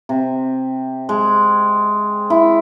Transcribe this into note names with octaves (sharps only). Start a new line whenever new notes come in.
C3
G#3
E4